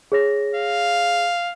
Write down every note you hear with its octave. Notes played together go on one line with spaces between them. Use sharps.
G#4 C#5 A#6
F5